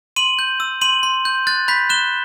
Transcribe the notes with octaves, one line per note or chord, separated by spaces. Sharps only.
C6 D#7 F#7
G6
E6
C6 D#7 F#7
C6
G6
F#6 A6
B5 G6 B6
F#6 E7 G7